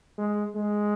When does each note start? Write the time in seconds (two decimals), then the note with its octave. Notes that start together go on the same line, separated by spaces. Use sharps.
0.18 G#3
0.55 G#3